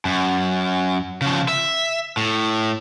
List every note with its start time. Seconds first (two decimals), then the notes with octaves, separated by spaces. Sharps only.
0.05 F#2
1.22 C#3 F3
1.48 E5
2.17 A2